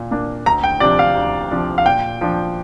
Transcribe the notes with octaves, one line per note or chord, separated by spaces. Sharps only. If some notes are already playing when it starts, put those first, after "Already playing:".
Already playing: A#2
A#3 D4
D2 A#5
G5
C3 F3 D4 D5
F5
D2
C3 F3 D4
F5
A#2 G5
F3 D4